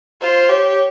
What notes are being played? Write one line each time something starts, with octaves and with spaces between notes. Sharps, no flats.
F4 C5
G4 C#5